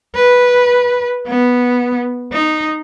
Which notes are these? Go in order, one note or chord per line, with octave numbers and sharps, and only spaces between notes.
B4
B3
D#4